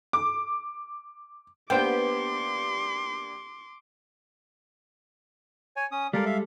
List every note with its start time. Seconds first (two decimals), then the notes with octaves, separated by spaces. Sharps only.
0.13 D6
1.70 A#3 B3 D4 G4 C5 G5 C6 D6
5.76 C#5 G#5
5.92 C#4 D#6
6.13 G3 G#3 A4 A#4 D5 F5
6.26 E5 F5